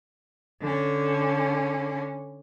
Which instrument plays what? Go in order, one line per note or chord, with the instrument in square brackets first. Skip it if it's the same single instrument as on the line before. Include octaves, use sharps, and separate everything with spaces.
[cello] D3 C#4